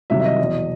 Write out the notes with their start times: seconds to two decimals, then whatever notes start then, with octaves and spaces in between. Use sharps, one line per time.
0.10 C2 C3 D#3 F#3 E5
0.20 E5
0.25 D#5
0.39 E2 B2 F#3